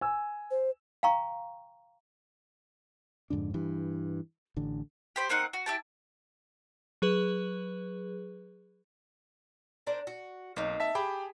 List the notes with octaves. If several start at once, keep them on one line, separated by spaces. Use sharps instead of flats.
G#5 E6
C5
F5 G5 A#5 C#6
F2 G#2 D3 D4
G2 E3
A1 D3
G4 C5 B5
A#3 C4 D#4 F#5
F#4
E4 G4 A5
F#3 G#4 B4
D4 A#4 C5
F#4
B1 A#3 C4 D#4
E5 A5 B6
G4 G#4 G5 A5 B5